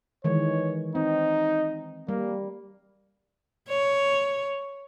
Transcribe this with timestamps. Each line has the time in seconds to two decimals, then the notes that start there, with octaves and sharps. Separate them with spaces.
0.24 D#3 E3 G#3 C#5
0.95 C4 D#4
2.09 G3 A#3
3.69 C#5